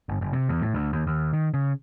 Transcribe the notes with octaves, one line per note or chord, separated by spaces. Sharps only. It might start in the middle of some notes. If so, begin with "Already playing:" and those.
G1
F#1
C3
E2
A2
D2
D#2
D#2
D#3
C#3